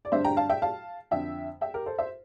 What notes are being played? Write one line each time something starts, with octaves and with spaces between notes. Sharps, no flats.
D5
G2 D3 C5 E5
G5 A#5
F5 A5
E5 G5
F5 A5
F2 D3 E5 G5
E5 G5
G4 A#4
A4 C5
C5 E5